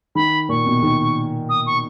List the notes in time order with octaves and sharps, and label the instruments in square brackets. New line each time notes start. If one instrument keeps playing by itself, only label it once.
[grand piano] D#3 [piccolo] B5
[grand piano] A#2 [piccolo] C#6
[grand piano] B2
D#3
[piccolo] D#6
C#6